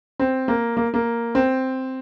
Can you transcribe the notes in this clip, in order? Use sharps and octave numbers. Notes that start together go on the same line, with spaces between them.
C4
A#3
A#3
A#3
C4